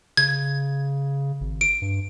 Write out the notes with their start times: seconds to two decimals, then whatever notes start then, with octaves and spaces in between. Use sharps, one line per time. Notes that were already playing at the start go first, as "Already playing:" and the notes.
0.17 C#3 G#6
1.41 G#1
1.61 D7
1.82 G2